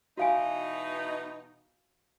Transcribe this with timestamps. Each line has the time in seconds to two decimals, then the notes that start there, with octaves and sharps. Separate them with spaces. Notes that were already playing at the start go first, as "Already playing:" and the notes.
0.17 B2 E3 D#4 F#4 F5 G#5